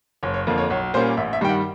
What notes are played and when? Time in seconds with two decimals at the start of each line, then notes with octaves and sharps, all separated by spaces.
0.23 F#1 C#5
0.34 C#5
0.47 F2 D3 F3 A#3
0.58 C#5
0.70 B1 C#5
0.94 A#2 G3 A#3 C#4 C5
1.17 A1 E5
1.33 E5
1.41 G2 D#3 G3 G5
1.49 F#5